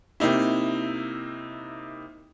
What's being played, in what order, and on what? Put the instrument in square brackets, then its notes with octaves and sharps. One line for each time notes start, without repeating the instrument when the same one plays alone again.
[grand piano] C3 A#3 D#4 E4